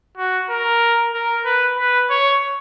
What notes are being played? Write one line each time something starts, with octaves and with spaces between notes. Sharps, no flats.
F#4
A#4
A#4
B4
B4
C#5